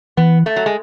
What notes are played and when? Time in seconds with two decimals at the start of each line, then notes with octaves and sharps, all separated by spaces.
0.17 E3 B3
0.46 A3
0.56 F#3
0.66 G#3